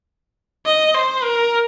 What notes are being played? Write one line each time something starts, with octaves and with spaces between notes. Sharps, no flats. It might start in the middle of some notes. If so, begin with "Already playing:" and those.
D#5
C5
A#4